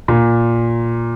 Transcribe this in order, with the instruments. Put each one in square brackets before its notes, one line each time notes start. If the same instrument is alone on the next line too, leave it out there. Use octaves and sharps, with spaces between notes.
[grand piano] A#2